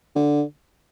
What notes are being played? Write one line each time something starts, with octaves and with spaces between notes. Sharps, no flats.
D3